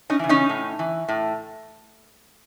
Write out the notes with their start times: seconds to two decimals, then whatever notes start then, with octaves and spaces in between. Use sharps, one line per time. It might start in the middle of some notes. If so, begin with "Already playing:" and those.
0.10 C#4 D#4
0.19 C#3 E3
0.29 C#4 D#4
0.49 A2
0.79 E3
1.08 A2